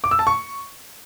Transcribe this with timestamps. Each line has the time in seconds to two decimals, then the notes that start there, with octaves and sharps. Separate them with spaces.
0.04 D6
0.11 E6
0.19 A5
0.27 C#6